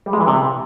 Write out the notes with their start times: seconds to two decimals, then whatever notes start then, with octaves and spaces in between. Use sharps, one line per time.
0.06 G3
0.13 G#3
0.20 E3
0.27 C3